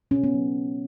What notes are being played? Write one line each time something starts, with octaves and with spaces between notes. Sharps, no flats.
B2 C#4
B3
F#3